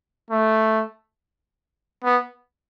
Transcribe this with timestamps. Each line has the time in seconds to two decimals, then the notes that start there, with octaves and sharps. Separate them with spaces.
0.31 A3
2.04 B3